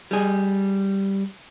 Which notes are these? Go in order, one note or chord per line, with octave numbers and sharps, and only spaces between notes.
G3 G#4